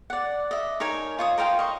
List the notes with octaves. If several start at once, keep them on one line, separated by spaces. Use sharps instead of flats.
D5 F#5
D#5 E5
D#4 A#4 C#5 G#5
F4 C#5 D#6
A#4 C5 F5 G5
D#5 C#6